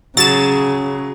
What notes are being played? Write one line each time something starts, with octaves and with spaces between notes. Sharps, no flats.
C#3 F#3 G#4 A6 E7